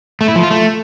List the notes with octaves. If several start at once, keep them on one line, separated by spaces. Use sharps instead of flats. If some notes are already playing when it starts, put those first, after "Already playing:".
A3
E4
F3
F4
A3